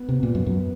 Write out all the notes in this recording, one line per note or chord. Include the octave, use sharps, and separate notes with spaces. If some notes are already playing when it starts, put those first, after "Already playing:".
Already playing: B3
C3
A#2
F#2
F#2